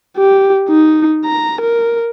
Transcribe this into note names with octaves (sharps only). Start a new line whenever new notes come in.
G4
D#4
A#5
A#4